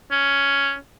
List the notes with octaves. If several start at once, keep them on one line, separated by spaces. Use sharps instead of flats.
C#4